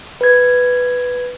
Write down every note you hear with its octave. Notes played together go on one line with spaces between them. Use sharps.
B4 G#6